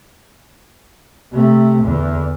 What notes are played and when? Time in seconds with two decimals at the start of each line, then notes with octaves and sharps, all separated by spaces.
1.32 C3 A3
1.84 E2 D3